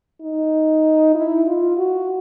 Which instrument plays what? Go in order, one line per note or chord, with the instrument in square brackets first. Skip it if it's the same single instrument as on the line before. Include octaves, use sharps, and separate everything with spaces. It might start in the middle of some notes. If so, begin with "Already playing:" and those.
[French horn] D#4
E4
F4
F#4